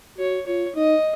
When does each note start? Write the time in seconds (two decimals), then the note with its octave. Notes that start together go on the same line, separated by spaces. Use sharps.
0.18 F#4 C#5
0.47 F4 C#5
0.75 D#4 D#5